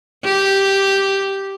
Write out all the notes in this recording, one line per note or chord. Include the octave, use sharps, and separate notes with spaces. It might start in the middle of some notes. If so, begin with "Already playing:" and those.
G4